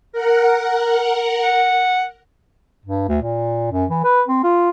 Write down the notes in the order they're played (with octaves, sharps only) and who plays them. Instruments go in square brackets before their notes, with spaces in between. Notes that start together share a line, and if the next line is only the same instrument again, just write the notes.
[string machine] A#4 F#5
[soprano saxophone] F#5
[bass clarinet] G2
D2
A#2
F#2
E3
B4
C4
F4